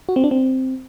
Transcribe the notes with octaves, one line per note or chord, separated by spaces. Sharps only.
F#4
C4
D4
C4